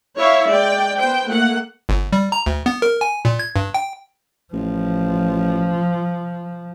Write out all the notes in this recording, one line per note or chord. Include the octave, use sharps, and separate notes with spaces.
E4 C#5 E5 F5
G#3 D5 G5
B3 C5 G5
A3 A#3 F#5
G1
G3
A#5
D2
B3
A#4
G#5
A#2
G#6
G2
G5
A1 F3